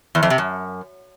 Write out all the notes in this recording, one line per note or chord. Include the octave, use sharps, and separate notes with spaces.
E2
F2
C3
F#2